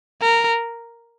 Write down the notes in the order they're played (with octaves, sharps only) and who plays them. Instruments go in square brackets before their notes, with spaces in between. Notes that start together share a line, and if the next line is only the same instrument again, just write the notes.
[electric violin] A#4